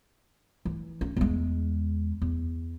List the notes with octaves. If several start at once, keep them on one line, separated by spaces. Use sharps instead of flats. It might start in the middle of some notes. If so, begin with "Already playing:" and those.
E3
C#4
E2 G#3
E2